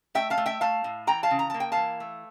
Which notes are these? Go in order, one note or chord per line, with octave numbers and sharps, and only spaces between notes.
A3 E5 G5
F5 A5
A3
E5 G5
A3 F5 A5
A2
E3 G5 A#5
F5 A5
C#3
A#5
A#3 A5
G5
E3 F5 A5
A3